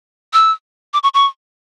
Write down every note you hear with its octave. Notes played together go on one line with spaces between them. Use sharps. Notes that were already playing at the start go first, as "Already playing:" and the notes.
E6
D6
C#6
C#6